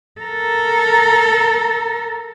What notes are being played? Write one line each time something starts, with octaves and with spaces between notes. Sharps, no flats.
A4 A#4